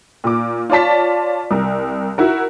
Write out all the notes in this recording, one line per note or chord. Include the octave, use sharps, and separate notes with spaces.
A#2 D6
F4 C#5 D5 A5 B6
C2 A#4
E4 F#4 A#4